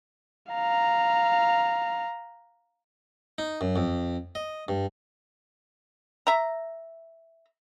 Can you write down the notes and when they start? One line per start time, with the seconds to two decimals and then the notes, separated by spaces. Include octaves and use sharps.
0.52 F5 A#5
3.38 D#4
3.61 F#2
3.76 F2
4.35 D#5
4.68 G2
6.27 E5 A#5